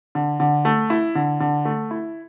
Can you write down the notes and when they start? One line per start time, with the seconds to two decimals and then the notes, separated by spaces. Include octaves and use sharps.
0.15 D3
0.40 D3
0.65 A3
0.90 E4
1.15 D3
1.40 D3
1.65 A3
1.91 E4